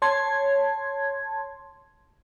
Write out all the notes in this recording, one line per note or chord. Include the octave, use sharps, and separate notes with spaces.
C#5 A5 C6 G#6